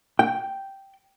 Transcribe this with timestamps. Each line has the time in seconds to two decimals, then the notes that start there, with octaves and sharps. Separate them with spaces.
0.19 G5